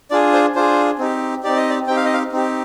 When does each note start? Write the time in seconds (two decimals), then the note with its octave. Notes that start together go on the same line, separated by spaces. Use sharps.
0.11 D4 F4 G#4 D5
0.33 C5
0.55 D4 F4 G#4 C5
0.99 C4 D#4 G4
1.43 C4 D#4 G4 D5
1.57 D#5
1.70 D5
1.87 C4 D#4 G4 G5
1.96 F5
2.05 D#5
2.14 F5
2.32 C4 D#4 G4